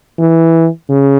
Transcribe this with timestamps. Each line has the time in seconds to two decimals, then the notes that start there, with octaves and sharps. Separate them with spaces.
0.19 E3
0.89 C#3